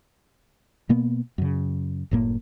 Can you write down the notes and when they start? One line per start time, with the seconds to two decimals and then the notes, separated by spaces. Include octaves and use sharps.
0.89 B2 A#3 B3
1.38 F#2 C#3
2.11 F#1 A2 A#3